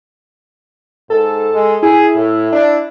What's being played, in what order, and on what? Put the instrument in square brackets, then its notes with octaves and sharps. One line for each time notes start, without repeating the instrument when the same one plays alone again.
[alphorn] G#2 [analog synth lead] A4
[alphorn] G#3
[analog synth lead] E4 [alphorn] G#4
[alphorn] A2
D4